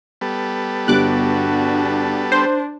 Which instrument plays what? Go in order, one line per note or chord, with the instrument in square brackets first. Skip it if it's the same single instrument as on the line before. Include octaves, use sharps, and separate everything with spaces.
[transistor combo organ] G3 B3 A4
[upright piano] G1 G2 [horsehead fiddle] D4 F#4 [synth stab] D6 F#6
[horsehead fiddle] D4 [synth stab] C5